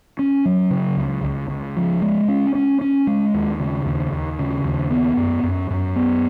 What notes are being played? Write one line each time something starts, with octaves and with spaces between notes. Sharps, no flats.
C#4
F#3
C#3
C#2
C#2
C#2
F3
G#3
C#4
C#4
C#4
G#3
D#2
C#3
D#2
D#2
C#3
D#2
B3
F#2
F#2
F#2
B3